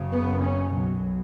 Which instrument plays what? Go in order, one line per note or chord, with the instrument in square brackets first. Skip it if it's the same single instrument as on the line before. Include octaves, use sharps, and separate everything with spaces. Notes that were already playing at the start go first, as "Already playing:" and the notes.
Already playing: [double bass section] F#1 F#2 C#3
B3
C#4
B1 B2 F#3